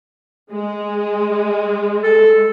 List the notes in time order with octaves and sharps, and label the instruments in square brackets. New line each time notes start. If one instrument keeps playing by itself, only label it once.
[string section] G#3
[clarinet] A4